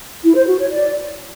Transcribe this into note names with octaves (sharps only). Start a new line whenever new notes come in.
E4
C5
F#4
C#5
D5